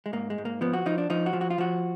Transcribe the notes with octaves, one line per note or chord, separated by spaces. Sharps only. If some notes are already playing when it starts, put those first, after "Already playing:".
G#3
G#2 A#3
G#3
G#2
A#3
F3 B3
F#4
F3 D#4
D4
F3 D#4
F#4
F3
F#4
F4
F3 F#4